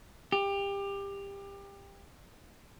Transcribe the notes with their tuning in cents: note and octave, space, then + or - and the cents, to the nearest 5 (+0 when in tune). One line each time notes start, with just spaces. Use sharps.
G4 +25